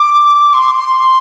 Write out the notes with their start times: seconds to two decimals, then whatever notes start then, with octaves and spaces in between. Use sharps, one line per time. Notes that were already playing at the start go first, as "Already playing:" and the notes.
Already playing: D6
0.49 D6
0.53 C6
0.75 C6